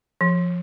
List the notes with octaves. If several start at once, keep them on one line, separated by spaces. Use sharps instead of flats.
F3